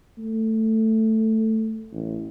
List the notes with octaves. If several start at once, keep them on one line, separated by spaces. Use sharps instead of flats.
A3
A1